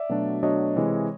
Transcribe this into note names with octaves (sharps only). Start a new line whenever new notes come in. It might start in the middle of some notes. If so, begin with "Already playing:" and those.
Already playing: D5 E5
B2 F#3 A3 D4
B2 F#3 A3 D4 C#5 D#5
C3 E3 G#3